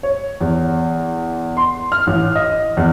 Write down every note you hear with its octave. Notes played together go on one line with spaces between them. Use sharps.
C#5
E2
C6
F6
A1
D#5
E2